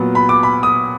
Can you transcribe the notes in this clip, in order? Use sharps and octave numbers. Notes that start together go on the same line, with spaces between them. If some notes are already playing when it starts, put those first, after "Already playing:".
Already playing: A#2 F#3 B3
B5
D6
B5
D#6